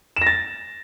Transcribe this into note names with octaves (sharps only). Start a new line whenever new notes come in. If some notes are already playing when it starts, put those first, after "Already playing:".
E7
A#6
A6